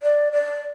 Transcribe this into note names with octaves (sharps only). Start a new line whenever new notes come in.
D5
D5